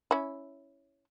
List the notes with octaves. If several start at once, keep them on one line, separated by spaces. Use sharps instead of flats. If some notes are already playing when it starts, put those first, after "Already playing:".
C#4 E4